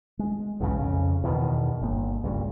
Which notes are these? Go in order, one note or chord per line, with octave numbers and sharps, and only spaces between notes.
G#3
B1 E2 G#2 C#3
F2 C#3
E2 B2 D3 D#3
G1 A#3
C#2 G2 A#2